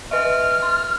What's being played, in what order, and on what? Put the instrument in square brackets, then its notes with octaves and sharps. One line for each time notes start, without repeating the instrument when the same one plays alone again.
[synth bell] B4 D#5 E5 [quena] F6
[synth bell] C6